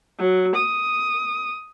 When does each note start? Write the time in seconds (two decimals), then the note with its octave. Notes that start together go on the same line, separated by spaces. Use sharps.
0.20 F#3
0.56 D#6